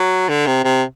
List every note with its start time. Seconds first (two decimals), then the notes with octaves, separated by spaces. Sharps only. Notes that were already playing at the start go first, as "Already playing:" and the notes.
Already playing: F#3
0.29 D3
0.47 C3
0.64 C3